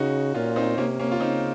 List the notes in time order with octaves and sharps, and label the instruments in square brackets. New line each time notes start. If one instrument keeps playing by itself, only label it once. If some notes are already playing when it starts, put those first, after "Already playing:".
Already playing: [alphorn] C#3 [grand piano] D#4 F#4
[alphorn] A#2 [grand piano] C#4 F4
[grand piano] C4 D#4
[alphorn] C3 [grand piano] A#3 C#4
[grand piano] A#3 C#4
F4
[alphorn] C#3 [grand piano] C4 D#4